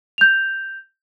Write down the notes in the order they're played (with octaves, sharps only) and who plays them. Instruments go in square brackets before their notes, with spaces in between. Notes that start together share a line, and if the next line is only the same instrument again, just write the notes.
[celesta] G6 F7